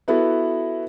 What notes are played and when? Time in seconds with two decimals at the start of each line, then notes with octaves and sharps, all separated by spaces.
0.08 B3 E4 F#4 A4